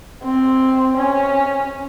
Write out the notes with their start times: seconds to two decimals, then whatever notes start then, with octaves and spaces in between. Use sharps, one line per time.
0.23 C4
0.97 C#4